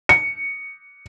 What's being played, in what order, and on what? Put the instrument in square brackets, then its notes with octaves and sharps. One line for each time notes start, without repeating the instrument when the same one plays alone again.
[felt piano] C#7